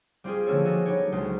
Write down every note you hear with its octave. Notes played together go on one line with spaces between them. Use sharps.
G3 C4 F4 G4 G#4
D3 F3 A#3 C#4 A4 C#5
F#4 G#4 A4 D#5
F#3 B3 D#4 G4 C#5
C#2 F#3 G#3 C5